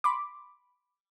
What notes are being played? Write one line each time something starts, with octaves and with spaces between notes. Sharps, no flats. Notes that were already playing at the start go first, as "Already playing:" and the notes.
B5 C6 D6